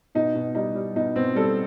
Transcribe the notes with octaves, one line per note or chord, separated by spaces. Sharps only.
B2 D#4
B2
G3 D#4
G3
B2 D#4
B2 C4
G3 A4